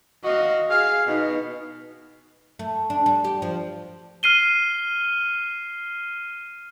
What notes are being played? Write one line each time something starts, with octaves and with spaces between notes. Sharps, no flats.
F#4 D#5 F5
G#4 F5
B2 D#4
A3
D4
G3
G4
F3
F6 C7 D#7 G7